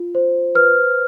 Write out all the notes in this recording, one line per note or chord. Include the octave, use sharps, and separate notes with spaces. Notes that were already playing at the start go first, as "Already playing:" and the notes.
Already playing: F4
C5
B4 F6